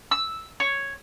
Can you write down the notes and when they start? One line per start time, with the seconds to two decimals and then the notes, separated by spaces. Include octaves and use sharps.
0.11 E6
0.60 C#5